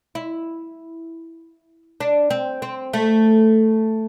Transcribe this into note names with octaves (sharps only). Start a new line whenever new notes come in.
E4
D4
C4
C4
A3